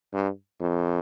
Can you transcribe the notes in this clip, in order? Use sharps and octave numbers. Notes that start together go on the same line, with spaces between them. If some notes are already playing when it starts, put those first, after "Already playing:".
G2
F2